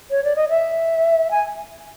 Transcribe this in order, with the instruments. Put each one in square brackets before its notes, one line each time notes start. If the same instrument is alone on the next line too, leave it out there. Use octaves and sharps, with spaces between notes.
[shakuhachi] C#5
D5
D#5
E5
G#5